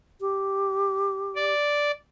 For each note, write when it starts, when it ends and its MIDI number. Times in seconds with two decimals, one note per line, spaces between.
0.20 1.53 67
1.36 1.91 74